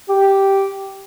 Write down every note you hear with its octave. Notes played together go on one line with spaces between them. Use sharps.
G4